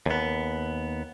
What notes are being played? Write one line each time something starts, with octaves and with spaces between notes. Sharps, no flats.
D#2 B3